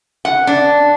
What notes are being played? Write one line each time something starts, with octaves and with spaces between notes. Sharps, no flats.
F#5
D4